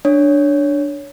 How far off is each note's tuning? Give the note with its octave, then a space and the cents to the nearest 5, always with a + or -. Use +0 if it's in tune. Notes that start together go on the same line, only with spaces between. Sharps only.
D4 +0 C#5 +10